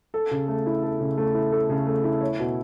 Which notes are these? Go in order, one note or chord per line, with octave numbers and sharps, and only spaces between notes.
A4
C#3
A3
E4
A4
C#3
A3
E4
A4
C#3
A3
E4
C#5
B2